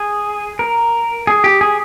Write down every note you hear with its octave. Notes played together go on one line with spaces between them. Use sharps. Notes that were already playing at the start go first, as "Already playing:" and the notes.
Already playing: G#4
A#4
G#4
G4
G#4